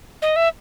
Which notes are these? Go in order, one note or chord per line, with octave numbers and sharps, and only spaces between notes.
D#5
E5